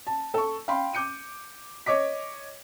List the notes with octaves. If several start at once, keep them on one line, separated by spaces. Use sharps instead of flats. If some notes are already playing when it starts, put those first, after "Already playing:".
A5
A4 C#6
F5 G5 B5 C6
D6 G6 C#7 D#7
C#5 D#5 D6 B6